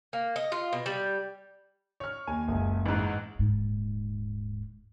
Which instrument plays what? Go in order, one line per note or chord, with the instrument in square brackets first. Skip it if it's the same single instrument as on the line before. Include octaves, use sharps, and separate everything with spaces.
[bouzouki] A#3
D#5
F4
B2
G3
[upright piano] C#5 F6
[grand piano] D#2 [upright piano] G#5
[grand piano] F#1 C#2
[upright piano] A1 G#2
[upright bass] D#1 G#2